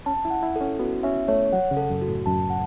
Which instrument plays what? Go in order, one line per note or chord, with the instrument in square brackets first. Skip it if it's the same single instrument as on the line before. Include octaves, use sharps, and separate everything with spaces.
[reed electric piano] C#4 [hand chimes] A5
[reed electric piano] E4
[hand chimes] F#5
[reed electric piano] E4
[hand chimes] A4
[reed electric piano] C#4
[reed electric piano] B3 [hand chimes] F#4
[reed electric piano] C#4 [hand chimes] E5
[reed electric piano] A3 [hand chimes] C#5
[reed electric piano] F#3 [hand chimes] F#5
[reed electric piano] C#3
[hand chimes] A4
[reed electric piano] F#2
[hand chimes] F#4
[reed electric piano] A2
[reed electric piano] F#2 [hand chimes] A5
[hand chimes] F#5